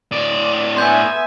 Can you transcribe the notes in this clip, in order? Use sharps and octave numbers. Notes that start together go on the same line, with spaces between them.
A2 D5
B3 E5 G#5 C6 G6